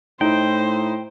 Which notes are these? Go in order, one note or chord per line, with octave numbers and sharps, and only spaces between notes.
A2 D#4 E4 C5 G5